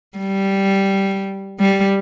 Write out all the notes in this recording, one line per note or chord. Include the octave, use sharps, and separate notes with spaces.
G3
G3